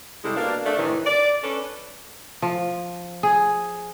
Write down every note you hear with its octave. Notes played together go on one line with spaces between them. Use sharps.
C3 G3 G#3 E4 A4
B2 A#3 D4
A3 D4
A2 C3 D#3 E3
D5
C#4 D4 A4 B4
F3
G#4